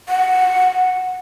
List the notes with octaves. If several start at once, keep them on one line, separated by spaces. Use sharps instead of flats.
F#5